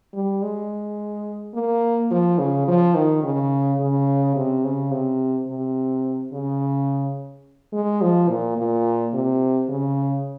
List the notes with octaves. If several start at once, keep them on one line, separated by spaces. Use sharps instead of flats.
G3
G#3
A#3
F3
C#3
F3
D#3
C#3
C#3
C3
C#3
C3
C3
C#3
G#3
F3
A#2
A#2
C3
C#3